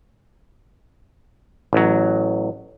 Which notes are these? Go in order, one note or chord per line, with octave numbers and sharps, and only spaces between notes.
A1 F#3